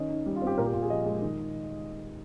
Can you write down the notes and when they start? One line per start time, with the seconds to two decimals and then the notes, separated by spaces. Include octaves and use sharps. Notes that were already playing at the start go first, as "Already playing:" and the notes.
Already playing: D#3 C#4 D#5
0.10 D#4
0.26 G3
0.36 F4
0.42 C4 G4
0.58 A#2 A#4
0.66 G4
0.73 A#2 F4
0.82 G#4
0.90 F3 D#5
1.06 G#3
1.22 D#3